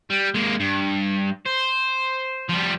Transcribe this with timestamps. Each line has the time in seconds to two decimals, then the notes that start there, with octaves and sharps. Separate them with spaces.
0.10 G3
0.35 G#3 A#3
0.60 G2
1.46 C5
2.49 F3 G3